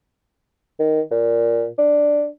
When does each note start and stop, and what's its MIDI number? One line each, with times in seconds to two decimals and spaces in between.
0.79 1.00 51
1.11 1.66 46
1.78 2.26 62